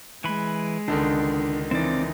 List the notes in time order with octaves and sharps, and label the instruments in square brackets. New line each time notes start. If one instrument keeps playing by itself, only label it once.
[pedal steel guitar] E3 B5 [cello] G#3
[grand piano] C#2 D3 D#3 [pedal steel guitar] D4
[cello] E3 D#4 [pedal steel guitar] C4 D5